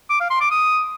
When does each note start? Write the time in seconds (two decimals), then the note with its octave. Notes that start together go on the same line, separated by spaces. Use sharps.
0.10 D6
0.20 F5
0.30 C6
0.40 D6
0.50 D#6